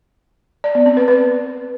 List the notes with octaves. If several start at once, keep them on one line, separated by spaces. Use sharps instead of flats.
D5
B3
C4
B4
B4